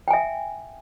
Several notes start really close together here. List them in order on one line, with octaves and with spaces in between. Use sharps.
G5 G#5 E5